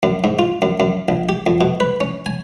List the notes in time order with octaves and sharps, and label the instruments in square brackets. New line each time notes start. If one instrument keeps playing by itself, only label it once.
[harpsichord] F#2
G#2
F4
F#2
F#2
A#1
G4
F2
B2
B4
C#4
G#5